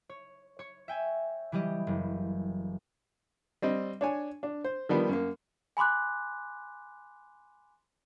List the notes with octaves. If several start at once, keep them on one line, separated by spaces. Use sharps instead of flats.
C#5
C#5 C#6
E5 G5 G#5
E3 F#3 G3 G4 D#5
F#1
G3 C4 D#5
D4 C#5 G#5
D4
C5
D#3 F3 G3 B3
F#2 A#3
G#5 B5 C6 D6 F#6